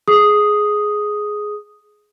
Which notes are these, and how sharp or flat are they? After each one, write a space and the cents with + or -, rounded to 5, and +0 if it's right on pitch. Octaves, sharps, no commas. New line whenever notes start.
G#4 +10 D#6 +0